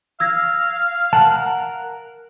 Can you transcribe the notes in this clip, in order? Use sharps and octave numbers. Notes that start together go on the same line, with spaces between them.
F5 E6 G#6 A#6
A#4 F#5 A5